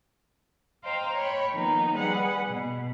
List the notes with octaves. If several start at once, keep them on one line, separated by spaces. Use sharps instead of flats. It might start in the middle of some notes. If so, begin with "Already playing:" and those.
C5 D#5 F5 G5 A#5
C#5 G5 B5
D#3 F3 A#3 B3 D#4
G3 G#4 B4 F#5
B2